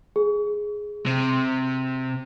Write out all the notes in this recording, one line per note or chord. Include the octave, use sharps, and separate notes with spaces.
G#4
C3